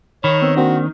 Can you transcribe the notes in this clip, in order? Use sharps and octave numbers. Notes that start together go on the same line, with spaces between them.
D#3 C#5 B5
B3 C4 E6
A#3 C4 D4 F#4